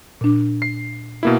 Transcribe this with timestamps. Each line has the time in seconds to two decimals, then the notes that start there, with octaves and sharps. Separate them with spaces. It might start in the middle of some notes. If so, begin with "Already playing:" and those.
0.21 A#2 D4
0.62 C7
1.23 B2 A#3 E4